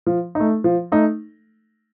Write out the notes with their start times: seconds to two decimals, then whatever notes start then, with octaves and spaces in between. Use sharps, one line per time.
0.06 F3
0.35 A3 D#4
0.64 F3
0.92 A3 D#4